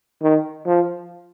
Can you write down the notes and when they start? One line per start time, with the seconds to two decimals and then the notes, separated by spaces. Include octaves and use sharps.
0.23 D#3
0.66 F3